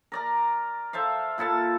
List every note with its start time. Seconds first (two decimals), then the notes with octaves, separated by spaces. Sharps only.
0.12 A#4 D5 A#5
0.93 A4 C5 E5 F5
1.38 A#2 E4 A4 A5